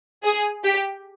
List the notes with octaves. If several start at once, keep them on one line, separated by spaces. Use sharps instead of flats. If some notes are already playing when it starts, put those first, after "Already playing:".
G#4
G4